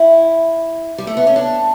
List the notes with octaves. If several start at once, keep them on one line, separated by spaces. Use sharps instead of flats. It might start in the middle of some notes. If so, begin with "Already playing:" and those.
Already playing: E4
G3
A3
B3
C#4
D4